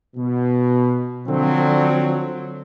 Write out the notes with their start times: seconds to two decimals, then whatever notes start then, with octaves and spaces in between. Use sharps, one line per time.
0.16 B2
1.27 D3 F3 F#3 C4